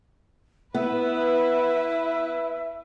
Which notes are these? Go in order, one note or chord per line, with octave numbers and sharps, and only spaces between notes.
B3 E4 B4 E5